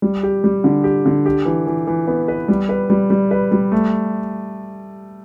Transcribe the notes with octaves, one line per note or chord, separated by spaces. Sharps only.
G3
G4
G3
D3
G4
D3
G4
E3
E3
E3
B3
B4
G3
B4
G3
G3
B4
G3
A3